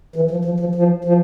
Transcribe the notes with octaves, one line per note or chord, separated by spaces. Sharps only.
E3
F3
F3
F3
F3
F3